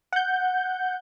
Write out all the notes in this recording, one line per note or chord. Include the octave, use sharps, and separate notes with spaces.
F#5 G6